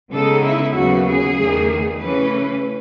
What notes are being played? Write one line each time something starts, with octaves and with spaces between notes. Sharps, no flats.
C#3 G#3 B3 D#4 A4
E4
D#2 C#3 F#3 B3 F#4
G#4
E2 D#3 A3
C#3 E3 A3 C#4 B4